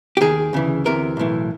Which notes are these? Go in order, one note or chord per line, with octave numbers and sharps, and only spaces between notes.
G4
D#2 D#3 G#4
D2 C#3 E3
D2 C3 E3 A#4
B1 A2 E3